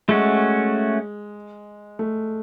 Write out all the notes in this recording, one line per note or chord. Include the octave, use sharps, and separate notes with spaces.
G#3 A3 C#4 F#4
A3